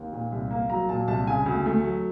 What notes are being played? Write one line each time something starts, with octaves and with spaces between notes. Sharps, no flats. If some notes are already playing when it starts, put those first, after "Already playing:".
Already playing: D#2
A#2
C2
A#3
F#3 A#5
A#2 A5
C2 A5
C#3 G#5
D2
A3
F#3